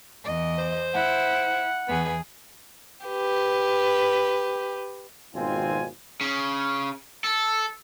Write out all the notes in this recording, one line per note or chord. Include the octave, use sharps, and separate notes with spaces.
E2 D#5
C5
E4 F#5
E2 B3 G#4
G4 B4
G#1 D#2 B2 C4 F4 G#5
C#3
A4